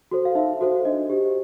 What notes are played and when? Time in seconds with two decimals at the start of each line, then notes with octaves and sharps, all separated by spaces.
0.11 F#4 A4 C5
0.25 F5
0.35 D#4 E5
0.61 F#4 A4 C5
0.85 D4 D#5
1.10 G4 C5